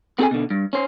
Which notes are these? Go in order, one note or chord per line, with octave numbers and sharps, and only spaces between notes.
B3 C4 G#4 A4 G5 G#5
B2 D3
G2
C#4 C5